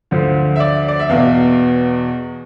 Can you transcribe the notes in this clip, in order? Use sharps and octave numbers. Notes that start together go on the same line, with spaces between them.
D2 D3 F3 C5
E5
D5
D5
E5
E2 B2 F5